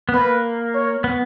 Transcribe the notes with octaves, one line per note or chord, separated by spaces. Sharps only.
B3
A#3 B4
C#5
B3